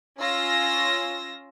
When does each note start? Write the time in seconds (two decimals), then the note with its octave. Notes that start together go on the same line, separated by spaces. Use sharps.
0.18 C#4 F4 E6 A#6